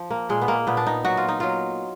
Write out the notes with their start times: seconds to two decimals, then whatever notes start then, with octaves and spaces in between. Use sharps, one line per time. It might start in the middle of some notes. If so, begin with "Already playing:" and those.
Already playing: F3
0.10 A#3
0.29 A#2 G#3
0.42 B3
0.48 A#3
0.67 A#2 B3
0.77 D4
0.86 D#4
1.05 F#3 F#4
1.17 F4
1.28 D#4
1.40 F#3 F4